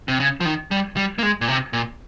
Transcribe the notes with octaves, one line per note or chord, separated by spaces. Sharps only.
C3
C#3
F3
D#3
G3
G3
A#3
G#3
A#2
C3
A#2